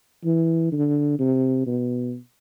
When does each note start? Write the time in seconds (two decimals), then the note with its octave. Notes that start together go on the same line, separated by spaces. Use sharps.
0.25 E3
0.72 D3
1.19 C3
1.67 B2